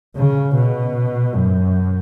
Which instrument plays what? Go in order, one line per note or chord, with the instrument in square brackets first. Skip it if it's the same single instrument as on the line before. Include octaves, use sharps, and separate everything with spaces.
[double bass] C#3
B2
F#2